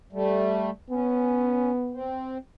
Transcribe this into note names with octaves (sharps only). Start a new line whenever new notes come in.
G3 A3
B3 C#4
C4